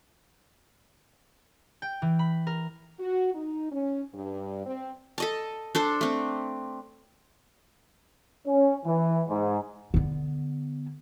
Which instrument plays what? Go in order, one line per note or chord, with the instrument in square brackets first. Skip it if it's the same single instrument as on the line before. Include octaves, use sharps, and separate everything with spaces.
[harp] G5
E3
B5
A#4
[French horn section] F#4
D#4
C#4
G2
C4
[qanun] A4 D#5 A5
D4 A4 C5
A3 C4
[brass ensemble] C#4
E3
G#2
[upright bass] D3 B3